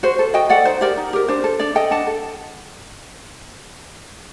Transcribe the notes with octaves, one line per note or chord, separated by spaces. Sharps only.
F#4 C5
A4
F#4 D#5 G5
A4 D5 F#5
D#4 C5
G4 A#4 D5
D#4
G4 A#4
D4 C5
A4
D4 D5
A4 D#5 G5
D4 F#5 A5
A4